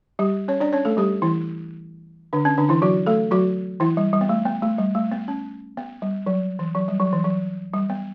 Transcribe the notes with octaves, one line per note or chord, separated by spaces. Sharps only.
G3 G4
C#4 C#5
D4 D5
C#4 C#5
A3 A4
G3 G4
E3 E4
D3 D4
C#4
D3 D4
E3 E4
F#3 F#4
A3 A4
F#3 F#4
E3 E4
G3
G3
B3
A3
B3
A3
G3
A3
B3
C#4
B3
G3
F#3
E3
F#3
G3
F#3
E3
F#3
G3
B3